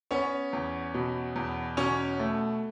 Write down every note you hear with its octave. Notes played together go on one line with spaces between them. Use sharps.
B3 C#4 C#5
E2
B2
E2
B2 C#4 C#5
A3